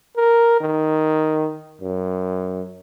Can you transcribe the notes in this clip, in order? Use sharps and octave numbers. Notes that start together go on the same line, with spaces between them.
A#4
D#3
F#2